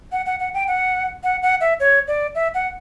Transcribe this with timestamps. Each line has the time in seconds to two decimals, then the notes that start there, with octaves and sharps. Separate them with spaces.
0.12 F#5
0.26 F#5
0.40 F#5
0.54 G5
0.68 F#5
1.24 F#5
1.42 F#5
1.61 E5
1.80 C#5
2.08 D5
2.35 E5
2.54 F#5